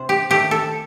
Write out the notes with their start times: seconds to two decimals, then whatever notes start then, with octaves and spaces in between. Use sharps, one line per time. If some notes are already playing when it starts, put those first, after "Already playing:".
Already playing: C3 C5
0.09 G4
0.30 D#3 A3 G4
0.51 A4